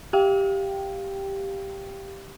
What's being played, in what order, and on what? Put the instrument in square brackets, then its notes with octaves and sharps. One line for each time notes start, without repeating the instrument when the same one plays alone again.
[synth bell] G4 F5 G5